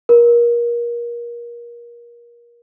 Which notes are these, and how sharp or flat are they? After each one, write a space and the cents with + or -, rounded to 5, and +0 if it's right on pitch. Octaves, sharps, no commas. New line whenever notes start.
A#4 +25